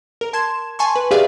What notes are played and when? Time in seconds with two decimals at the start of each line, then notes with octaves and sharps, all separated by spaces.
0.21 A#4
0.33 A5 C6 G#6 E7
0.79 G#5 A5 C6 C#6
0.96 B4
1.11 G4 G#4 B4 D5 E5 F5